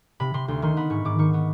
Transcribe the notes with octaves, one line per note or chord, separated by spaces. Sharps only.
C3 B5
C3 C6
D2 C6
D#3 C6
B3 B5
G#2 C#6
G#2 D6
D#3 C#6
B3 C#6